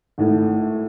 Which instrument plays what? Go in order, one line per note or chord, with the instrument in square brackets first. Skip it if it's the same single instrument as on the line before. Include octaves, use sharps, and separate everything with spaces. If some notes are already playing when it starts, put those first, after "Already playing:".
[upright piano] G#1 A2